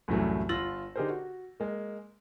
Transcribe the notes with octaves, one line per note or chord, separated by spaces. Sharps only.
C2 F#2 A2 E3 F#3 A3
G1 F4 E6 A6 A#6 F#7
D3 D#4 G4 G#4 A#4 C5
F#4
G#3 A#3